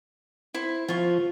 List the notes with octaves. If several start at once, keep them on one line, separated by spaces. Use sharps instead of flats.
E4 C5
F3 F4 C#6